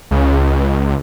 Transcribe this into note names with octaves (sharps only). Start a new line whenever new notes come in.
C#2